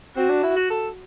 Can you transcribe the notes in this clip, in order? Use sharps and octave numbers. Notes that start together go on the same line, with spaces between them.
C4 F#4
D4
E4
F#4
A4